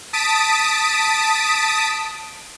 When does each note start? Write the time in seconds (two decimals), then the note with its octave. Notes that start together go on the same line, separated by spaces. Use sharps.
0.13 A5 D#6 B6 D7